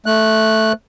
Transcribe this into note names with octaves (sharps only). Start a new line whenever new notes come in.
A3 F#6